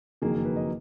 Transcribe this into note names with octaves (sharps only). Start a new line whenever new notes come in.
F#1 F2 D#3 F#3 A#3 G#4
A#4
B4
D#5